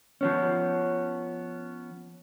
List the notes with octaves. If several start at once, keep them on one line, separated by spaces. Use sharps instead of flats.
F3 B3 C#4